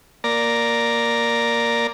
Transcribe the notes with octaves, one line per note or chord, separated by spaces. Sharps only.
A#3 D5 A#5